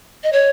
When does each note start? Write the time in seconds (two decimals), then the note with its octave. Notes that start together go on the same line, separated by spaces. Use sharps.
0.23 D#5
0.32 C#5